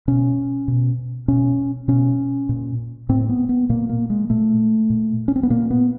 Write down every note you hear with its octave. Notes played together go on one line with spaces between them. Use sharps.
B2 C#4
B2
B2 C#4
B2 C#4
A#2
A2 C4
B3
B3
A#2 A#3
A#3
G#3
A#2 A3
A#2
C#4
C4
B3
A#2 A#3
B3